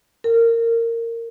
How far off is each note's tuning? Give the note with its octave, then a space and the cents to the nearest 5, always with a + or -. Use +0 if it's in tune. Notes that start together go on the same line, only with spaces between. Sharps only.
A#4 -20